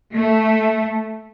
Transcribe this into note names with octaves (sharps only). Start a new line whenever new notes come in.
A3